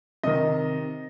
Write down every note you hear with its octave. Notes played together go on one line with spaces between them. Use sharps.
C3 D#3 D#5